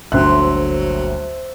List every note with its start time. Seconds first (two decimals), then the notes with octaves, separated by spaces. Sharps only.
0.12 G1 D2 A#2 F#3 C5 E5 G5 F#6